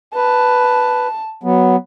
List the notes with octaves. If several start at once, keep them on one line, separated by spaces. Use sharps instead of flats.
B4 A5
F#3 B3